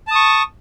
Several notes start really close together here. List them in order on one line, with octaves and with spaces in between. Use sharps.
A5 D#6 C#6